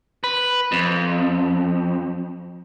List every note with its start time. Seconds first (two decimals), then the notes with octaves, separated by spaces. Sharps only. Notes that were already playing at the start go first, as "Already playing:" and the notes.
0.24 B4
0.72 F2